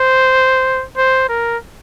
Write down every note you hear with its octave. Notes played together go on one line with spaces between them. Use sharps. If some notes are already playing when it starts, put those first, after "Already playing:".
Already playing: C5
C5
A#4